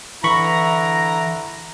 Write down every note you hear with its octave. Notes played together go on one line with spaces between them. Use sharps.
D3 E3 E4 A#5 B5 C#6